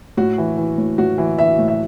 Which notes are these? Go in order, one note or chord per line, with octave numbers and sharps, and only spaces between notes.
A2 F#4
E3
E3
A2
A2 F#4
E3
E3 E5
A2
E5